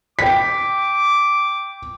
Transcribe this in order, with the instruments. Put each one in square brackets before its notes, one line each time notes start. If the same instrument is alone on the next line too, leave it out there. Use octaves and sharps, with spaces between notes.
[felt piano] G5 B6 [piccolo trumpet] D6